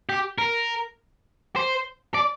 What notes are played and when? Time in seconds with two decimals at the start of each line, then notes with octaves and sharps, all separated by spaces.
0.09 G4
0.38 A#4
1.56 C5
2.15 D5